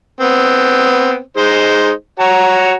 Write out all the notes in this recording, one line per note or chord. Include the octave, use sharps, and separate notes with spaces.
B3 C4
G#3 D#4 C5
F#4 C#5 A#5